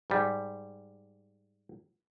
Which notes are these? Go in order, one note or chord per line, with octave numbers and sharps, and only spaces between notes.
G#2 G3